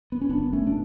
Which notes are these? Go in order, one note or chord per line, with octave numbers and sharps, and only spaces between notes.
B3
C#4
F#1 B3 D4
A3 C#4
B2 D4